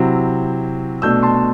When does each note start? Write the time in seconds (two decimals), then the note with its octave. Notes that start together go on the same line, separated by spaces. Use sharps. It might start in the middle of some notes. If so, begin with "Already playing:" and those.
Already playing: C3 F#3 C4 E4
1.02 B2 A3 D4 E6 G6
1.23 A5 C6